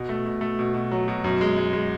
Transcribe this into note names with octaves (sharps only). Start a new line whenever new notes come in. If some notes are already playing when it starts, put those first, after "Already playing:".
Already playing: B2
A3
B2
A3
B2
B2
F#3
B2
F#2
G#3
G#3
G#3